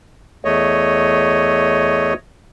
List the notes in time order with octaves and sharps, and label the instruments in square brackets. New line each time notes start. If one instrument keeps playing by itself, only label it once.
[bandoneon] E2 A3 C#5 D#5